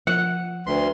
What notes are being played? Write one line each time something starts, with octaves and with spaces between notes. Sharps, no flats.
F3 F#5
D2 B4 C6